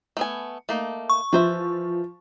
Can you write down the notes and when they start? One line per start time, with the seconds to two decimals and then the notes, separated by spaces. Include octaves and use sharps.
0.17 A3 B3 G#5
0.69 A3 A#3 D#4
1.09 C#6
1.33 E3 F3 C5 E5